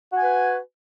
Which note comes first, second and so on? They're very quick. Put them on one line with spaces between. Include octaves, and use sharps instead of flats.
F#4 G#5 B4